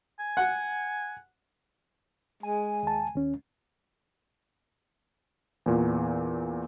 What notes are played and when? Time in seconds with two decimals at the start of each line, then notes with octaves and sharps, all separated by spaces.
0.19 G#5
0.37 F#5
2.43 G#3 G#5
2.83 D#2 A5
3.16 D#2 C#4
5.66 E2 A#2